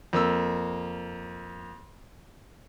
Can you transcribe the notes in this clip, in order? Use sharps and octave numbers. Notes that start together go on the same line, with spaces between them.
F2 A#3 E6